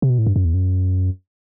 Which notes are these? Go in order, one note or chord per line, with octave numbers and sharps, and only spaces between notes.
C3
B2
A2
G2
F#2
E2
F#2